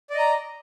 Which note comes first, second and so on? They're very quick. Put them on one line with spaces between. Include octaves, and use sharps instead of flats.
D5 D#5 A#5